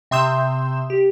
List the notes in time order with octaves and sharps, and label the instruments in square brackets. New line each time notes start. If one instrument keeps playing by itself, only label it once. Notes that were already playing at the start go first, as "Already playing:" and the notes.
[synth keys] C3 E5 C6 D#6 G6 E7
G4